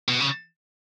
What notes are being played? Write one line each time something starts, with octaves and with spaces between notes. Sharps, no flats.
B2
C#3